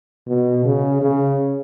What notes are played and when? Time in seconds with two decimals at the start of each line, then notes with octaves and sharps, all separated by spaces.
0.28 B2
0.65 C#3
1.02 C#3